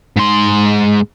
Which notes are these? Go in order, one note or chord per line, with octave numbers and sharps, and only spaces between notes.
G#2 C6